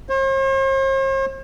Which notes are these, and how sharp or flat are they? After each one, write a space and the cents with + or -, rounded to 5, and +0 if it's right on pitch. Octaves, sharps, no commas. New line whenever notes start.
C5 +45